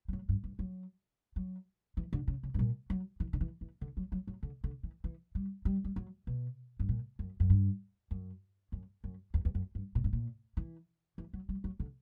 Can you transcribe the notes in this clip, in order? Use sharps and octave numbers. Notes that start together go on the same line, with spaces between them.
G3
F#3
G2
G2
F#3
F#3
E3
D3
C#3
C#3
G2
A#2
F#3
E3
D3
E3
E3
D3
F#3
F#3
F#3
D3
D3
E3
E3
G3
G3
G3
F#3
B2
G2
A#2
F#2
F#2
G2
F#2
F#2
F#2
E2
E2
F#2
G2
A#2
G2
A#2
E3
E3
F#3
G3
F#3
D3